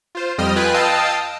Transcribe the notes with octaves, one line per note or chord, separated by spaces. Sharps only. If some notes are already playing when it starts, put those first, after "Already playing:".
F4 C5
F2 G3 D#5 G5 D#6 F6
F4 B4 G5 G#5 F#6
D#5 F5 G5 A5 D#6 E6